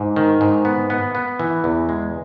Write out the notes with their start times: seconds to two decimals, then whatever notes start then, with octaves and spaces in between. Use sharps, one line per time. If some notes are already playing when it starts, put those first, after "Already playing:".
Already playing: G#2
0.16 D#3
0.41 G#2
0.65 B3
0.90 B3
1.15 B3
1.40 E3
1.64 E2
1.89 G#3